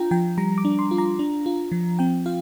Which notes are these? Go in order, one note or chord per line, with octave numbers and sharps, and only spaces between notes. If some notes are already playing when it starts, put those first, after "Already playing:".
Already playing: D4 F4 G5 A#5
F3 G5
G3 A#5
D6
D4
C6
F4
A#5
D4
F4
F3
C4 G5
F4 F5